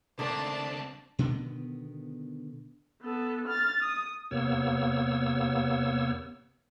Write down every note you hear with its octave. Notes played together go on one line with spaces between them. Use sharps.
C#2 D3 D#3 A3 C4 D4 A5
B2 D3 D#3 B3
B3 A4
F6 A6
D#6
E2 C3 A#3 B3 C#5 E6